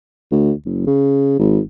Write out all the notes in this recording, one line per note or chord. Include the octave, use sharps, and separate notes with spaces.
D2
F#1
C#3
G#1